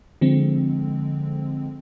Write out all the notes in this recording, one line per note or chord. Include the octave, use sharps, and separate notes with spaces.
D3 F3 G#3 C4